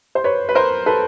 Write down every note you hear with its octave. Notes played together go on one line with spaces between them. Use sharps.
C5
B4 C#5
B4
A#4 C5
A4 B4